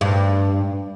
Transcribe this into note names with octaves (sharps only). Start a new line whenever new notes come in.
G2